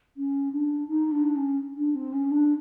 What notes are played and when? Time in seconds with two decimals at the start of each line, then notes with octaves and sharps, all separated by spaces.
0.17 C#4
0.52 D4
0.88 D#4
1.11 D4
1.36 C#4
1.77 D4
1.95 C4
2.13 C#4
2.31 D4